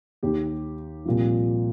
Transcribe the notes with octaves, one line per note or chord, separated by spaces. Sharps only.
D#2 D#3 G4
C2 A#2 F3